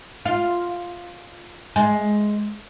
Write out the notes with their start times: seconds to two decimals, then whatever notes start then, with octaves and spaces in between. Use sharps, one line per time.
0.25 F4
1.76 G#3